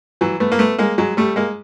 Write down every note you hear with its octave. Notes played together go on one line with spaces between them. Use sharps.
E3 F#3
A3 B3
A#3
A3 B3
G#3 A#3
F#3 G#3
G3 A3
G#3 A#3